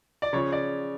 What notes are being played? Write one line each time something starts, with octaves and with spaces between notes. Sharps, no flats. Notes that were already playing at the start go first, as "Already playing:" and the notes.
D5
C#3 F3 C#5
D5